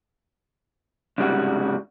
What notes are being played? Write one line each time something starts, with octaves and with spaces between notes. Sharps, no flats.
C2 G#2 C#3 G3 F#4